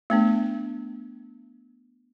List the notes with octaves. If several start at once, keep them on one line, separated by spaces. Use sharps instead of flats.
A3 B3 D4